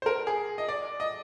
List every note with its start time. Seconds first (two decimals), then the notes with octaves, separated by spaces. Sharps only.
0.02 C5
0.06 A#4
0.27 G#4
0.58 D#5
0.69 D5
1.00 D#5